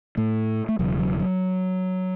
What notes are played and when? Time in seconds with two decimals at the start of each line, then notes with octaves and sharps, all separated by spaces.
0.17 A2 A3
0.69 A3
0.79 E1 E2 C#3 F#3
0.99 F#3
1.20 F#3